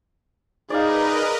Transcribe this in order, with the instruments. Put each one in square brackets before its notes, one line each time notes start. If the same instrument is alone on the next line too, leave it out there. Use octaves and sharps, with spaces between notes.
[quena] D#4 [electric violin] G#4 [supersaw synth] A#4 B4 D#5 [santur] D5 F5